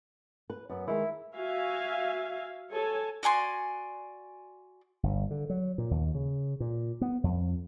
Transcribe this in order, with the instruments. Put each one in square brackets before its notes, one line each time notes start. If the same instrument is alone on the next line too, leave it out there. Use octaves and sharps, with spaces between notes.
[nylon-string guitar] B4
[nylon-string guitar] F#2 [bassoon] B3
[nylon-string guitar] D#3 G#3 [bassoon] E4
[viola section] F#4 E5 F5 G#5
A4 C#5 G#5
[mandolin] F#4 D5 G#5 C6
[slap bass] G1
D3
F#3
A#2
D#2
C#3
A#2
B3
F2